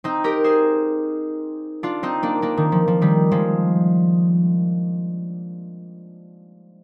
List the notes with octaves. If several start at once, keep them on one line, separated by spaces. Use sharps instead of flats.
C4 D#4
G4 A#4
G#4 C5
D4 F4
C4 D#4
A#3 D4
A#3 D4
D#3
F3
F3
D#3 G3
F3 G#3